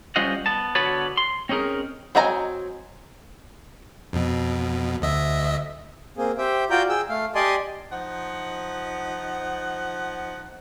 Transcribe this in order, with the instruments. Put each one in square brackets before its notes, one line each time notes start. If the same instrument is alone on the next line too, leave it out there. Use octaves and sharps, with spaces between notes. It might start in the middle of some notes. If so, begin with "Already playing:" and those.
[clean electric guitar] G3 C#4 F4 C5 D#5 F#5
B3 A5
D3 B3 F#4 B4 C#5 A5
C6
C4 C#4 D#4 G#4 A#4
[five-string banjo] F#3 C4 D#5 G#5 A#5
[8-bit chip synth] F2 B2
D2 D#5 E5
[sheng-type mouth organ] A#3 C4 G#4
G4 C5 E5 G5
F4 F#4 D5 G5 A#5 G6
G#4 G5 E6
A3 F5
G4 D5 D#5 G#5 A5 C6
[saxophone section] F3 D#4 F#5